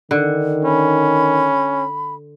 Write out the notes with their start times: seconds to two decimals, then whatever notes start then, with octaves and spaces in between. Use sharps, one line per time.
0.11 D3 D#3
0.65 C#4 B5